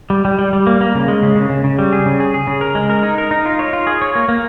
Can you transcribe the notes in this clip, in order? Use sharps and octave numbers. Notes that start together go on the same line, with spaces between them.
G3
G3
G3
G3
A#3
A#3
C#3
G#3
C#3
C#3
C#3
C#3
G3
G#4
C#3
G#4
G#4
C#3
A#4
G#3
A#4
D#4
A#4
D#4
F4
C#5
F4
G#4
C#5
A#3
A#3